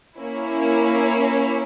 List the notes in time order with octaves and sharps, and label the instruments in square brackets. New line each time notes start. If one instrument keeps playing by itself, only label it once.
[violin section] A#3 C#4 E4